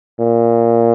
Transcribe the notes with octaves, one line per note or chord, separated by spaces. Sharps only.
A#2